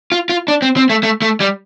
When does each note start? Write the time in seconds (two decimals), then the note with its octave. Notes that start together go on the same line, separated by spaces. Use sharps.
0.12 F4
0.29 F4
0.48 D4
0.62 C4
0.77 C4
0.90 A3
1.03 A3
1.22 A3
1.40 G3